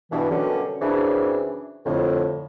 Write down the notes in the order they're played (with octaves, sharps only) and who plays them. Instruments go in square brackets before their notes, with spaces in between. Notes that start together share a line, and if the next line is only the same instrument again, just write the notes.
[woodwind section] G2 B2 E3
B2 D3 D#3 F#3 G3 C#4
F#2 C#3 E3 C4 D4
F2 A2 D3